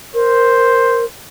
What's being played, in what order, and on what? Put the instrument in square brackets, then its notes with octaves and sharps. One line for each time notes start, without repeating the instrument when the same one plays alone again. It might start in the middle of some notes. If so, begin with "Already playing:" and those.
[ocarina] A#4 [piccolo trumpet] C5